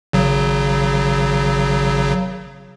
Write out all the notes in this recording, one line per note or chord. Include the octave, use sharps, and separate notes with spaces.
G#1 C#3 F#3